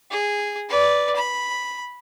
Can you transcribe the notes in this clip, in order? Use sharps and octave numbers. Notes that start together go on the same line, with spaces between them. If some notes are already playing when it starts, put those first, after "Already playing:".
G#4
B4 D5
B5